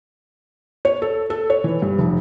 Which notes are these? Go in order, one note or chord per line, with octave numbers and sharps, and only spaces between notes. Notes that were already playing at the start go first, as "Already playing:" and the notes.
C#5
A4
A4
C#5
E3
G2
F1